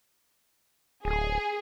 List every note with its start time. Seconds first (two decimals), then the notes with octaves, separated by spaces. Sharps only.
1.05 D1 G#4